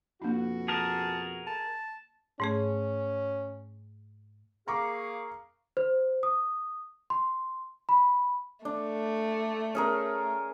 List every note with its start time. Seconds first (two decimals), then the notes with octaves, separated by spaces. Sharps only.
0.22 F2 B2 A#3 D4 E4 F#4
0.68 G#4 A#4 A5
1.47 A5 B5
2.40 G#2 A3 C#4 G#4
4.68 A#3 G#4 F5 A#5 C#6 D6
5.77 C5
6.23 D#6
7.10 C6
7.89 B5
8.65 A3 D4
9.75 C#4 G#4 A#4